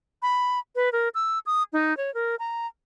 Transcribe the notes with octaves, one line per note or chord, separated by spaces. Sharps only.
B5
B4
A#4
E6
D#6
D#4
C#5
A#4
A#5